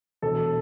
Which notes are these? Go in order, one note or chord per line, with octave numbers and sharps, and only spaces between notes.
E1 A4